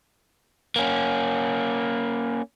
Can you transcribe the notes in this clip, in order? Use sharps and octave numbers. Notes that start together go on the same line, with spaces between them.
A#3 C#4